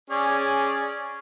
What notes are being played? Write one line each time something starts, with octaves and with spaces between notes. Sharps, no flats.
C#4 G#4 D5